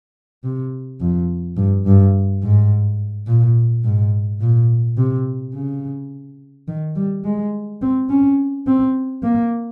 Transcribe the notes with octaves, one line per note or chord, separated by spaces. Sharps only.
C3
F2
G2
G2
G#2
A#2
G#2
A#2
C3
C#3
D#3
G3
G#3
C4
C#4
C4
A#3